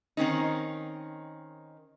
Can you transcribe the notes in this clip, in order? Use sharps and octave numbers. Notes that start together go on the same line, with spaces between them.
D#3 C4 C#4 D#4